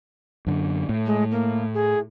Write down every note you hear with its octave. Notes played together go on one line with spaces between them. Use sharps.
F#2 D3
A2
G#3
A#3
G#4